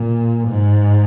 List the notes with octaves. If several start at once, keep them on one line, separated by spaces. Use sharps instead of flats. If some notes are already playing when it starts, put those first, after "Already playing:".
Already playing: A#2
G#2